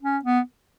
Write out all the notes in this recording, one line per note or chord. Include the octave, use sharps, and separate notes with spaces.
C#4
B3